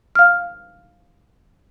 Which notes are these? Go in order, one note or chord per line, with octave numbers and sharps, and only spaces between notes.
F5 F6